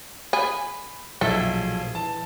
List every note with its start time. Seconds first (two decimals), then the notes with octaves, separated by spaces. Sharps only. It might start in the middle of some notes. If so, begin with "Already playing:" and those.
0.33 G#4 B5
1.21 B1 A#2 F3 G#4 A4 E5
1.95 E3 A5